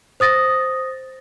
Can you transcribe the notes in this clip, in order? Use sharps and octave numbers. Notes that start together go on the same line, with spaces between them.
C5 D#6 A6 A#6